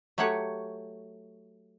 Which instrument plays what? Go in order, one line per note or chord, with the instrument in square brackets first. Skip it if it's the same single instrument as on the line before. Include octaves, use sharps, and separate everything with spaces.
[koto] F#3 A3 G4 C#5 F#5